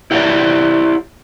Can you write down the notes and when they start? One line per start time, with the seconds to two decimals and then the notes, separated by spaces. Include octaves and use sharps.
0.11 E4 G4 C#5 D5 E5